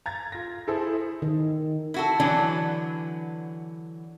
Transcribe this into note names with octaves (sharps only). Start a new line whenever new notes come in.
A#5 G#6 A6
F4 A#6
E4 G#4 A4 C5
D#3
E4 F#4 A4
D3 E3 F#3 B3 D4